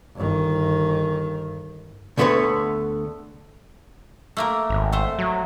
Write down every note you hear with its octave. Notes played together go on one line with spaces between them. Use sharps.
G1 D#3
D2 D3 A3 B3 B4 C#5
A3 A#3 A#4
G#1
A3 C5
F#3